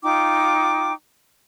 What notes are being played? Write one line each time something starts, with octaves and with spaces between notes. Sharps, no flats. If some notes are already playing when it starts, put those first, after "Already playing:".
D#4 F4 G5 D6